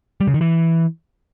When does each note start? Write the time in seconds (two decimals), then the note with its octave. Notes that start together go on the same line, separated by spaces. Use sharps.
0.21 G3
0.27 C#3
0.34 D#3
0.41 E3